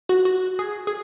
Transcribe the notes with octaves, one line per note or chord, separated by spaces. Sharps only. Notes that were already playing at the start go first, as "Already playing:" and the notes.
F#4
F#4
G#4
G#4